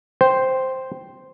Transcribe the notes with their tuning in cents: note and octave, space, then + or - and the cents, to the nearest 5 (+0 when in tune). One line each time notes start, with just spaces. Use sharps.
C5 +0 G5 +0